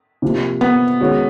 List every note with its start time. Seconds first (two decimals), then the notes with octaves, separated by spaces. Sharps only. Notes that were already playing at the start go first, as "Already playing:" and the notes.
0.22 C3 F3 A#3
0.61 B3
1.01 D#3 G#3 C#4 F#4